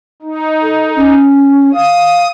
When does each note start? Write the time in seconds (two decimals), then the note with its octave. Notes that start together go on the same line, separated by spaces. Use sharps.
0.22 D#4
0.62 A4
0.96 C#4
1.74 F5 D#6